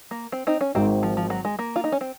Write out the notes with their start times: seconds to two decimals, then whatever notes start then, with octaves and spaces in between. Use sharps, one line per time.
0.11 A#3
0.32 C4
0.47 C4 D#4
0.61 C#4
0.75 G#1 G#2 D#3 C4
1.03 F3
1.17 F3
1.30 F#3
1.45 G#3
1.59 A#3
1.76 F4
1.84 D#4
1.92 C#4
2.01 C4